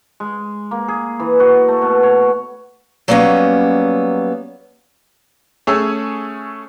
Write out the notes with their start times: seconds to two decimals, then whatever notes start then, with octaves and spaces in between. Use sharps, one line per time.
0.20 G#3
0.71 A#3
0.88 G#4
1.20 E3
1.40 F#4
1.68 A3
1.82 B2
2.03 C#5
3.08 F#3 G3 A#3 B3 C#4
5.67 A3 C#4 G#4 C#5 G#5 E6